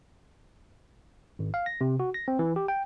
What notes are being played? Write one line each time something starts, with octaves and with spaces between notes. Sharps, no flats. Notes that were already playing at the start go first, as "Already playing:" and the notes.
G#1
F5
A#6
C3
F#4
A#6
C4
E3
G4
G5